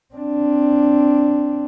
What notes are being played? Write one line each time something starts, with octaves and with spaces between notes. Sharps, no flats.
C4 D4